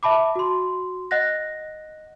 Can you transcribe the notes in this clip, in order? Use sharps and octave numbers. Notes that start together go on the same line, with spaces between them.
E5 A5 B5 D6
F#4 C6
D#5 F#5 F#6 A#6